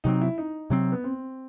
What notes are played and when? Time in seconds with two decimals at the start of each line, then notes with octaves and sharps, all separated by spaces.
0.04 C3 F#3 C4 D#4
0.21 E4
0.38 D#4
0.70 C3 F#3 C4
0.92 B3
1.04 C4